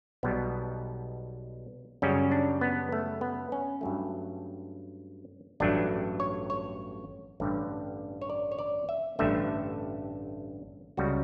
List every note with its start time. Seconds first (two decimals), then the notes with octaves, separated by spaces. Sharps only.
0.23 B1 B2 G3 B3
2.02 F#2 C#3 G3 C#4
2.32 D4
2.61 B3
2.92 A3
3.21 B3
3.52 C#4
3.81 G2 F#3 A3
5.60 A1 G2 F#3 A3 D4
6.20 C#5
6.50 C#5
7.40 A1 G2 D3 G3
8.22 C#5
8.30 D5
8.52 C#5
8.59 D5
8.89 E5
9.19 A1 G2 D3 A3 E5
10.97 C#2 C#3 G3 F#4